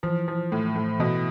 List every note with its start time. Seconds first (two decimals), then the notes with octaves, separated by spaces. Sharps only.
0.03 E3 F3
0.28 F3
0.52 A2
0.76 A2
1.00 B2 E3